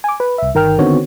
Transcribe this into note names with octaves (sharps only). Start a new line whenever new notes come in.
G#5 D6
B4
C2 E5
G1 D#3 A#4 G5 F6
D3 D#3 B3 C4 F#4 C#5